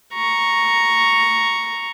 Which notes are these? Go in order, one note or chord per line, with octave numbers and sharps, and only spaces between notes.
A#5 C#6